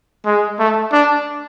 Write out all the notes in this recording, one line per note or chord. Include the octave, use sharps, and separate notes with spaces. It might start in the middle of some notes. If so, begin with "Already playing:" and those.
G#3
A3
D4